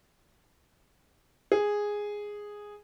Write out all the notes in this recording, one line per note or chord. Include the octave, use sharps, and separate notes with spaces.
G#4